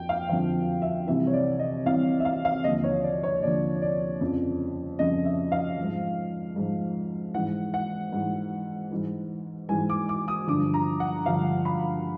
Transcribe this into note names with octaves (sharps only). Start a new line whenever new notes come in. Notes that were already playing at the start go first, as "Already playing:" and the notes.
Already playing: F2 F3 G5
F5
F2 D3 F3 F5
E5
C2 C3 E3 E5
C#5
D5
D#5
C2 C3 E3 F5
E5
F5
F5
D#2 D3 F3 D#5
C#5
D5
C#5
D#2 D3 F3 D5
D5
F2 C#3 F3
F2 C#3 F3 D#5
E5
F5
F3
G#2
G#2 F3
G#2 E3 F#5
F#5
G#2 E3
G#2 E3
G#2 E3 G#5
D6
D6
D#6
G2 D3 F3 D6
A#5
F#5
G2 D3 F3 F5
B5